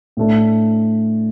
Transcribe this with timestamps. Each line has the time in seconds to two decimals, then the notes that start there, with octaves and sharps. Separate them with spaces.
0.17 A2 A3 D4